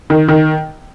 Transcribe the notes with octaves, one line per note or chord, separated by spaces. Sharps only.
D#3
D#3